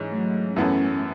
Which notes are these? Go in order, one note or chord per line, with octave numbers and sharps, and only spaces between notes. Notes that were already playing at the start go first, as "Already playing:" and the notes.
Already playing: G#2 E3 G#3 C#4
F#3 A3
F#2 E3 A3 B3 C#4 E4 A4